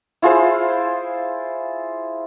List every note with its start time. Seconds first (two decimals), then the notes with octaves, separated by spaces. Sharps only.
0.22 E4 F4 G#4 C5